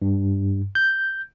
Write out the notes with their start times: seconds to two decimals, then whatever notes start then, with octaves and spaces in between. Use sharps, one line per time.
0.02 G2
0.75 G6